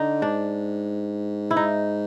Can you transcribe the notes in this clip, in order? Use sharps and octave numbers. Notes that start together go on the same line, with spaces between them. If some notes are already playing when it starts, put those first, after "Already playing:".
Already playing: D3 D#4
G#2 D4
E4
D#4